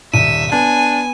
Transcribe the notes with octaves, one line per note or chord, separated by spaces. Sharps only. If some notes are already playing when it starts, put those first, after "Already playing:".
D#1 E5 D#7
B3 D4 G#5